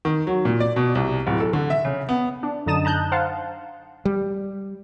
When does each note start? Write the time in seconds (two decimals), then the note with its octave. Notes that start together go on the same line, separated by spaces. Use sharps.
0.05 D#3
0.27 F#3
0.45 A#2
0.60 D5
0.76 B2
0.95 C2
1.27 D1
1.40 A4
1.53 D3
1.70 E5
1.85 C#3
2.09 B3
2.43 D4
2.66 F#2 D3 D#4 A5 D#6 E7
2.85 A5 A#5 F#6 G6
3.12 C5 F5 F#5 A5
4.05 G3